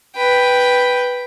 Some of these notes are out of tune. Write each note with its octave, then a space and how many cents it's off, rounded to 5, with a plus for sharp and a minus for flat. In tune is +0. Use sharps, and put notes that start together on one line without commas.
B4 +0 G5 +0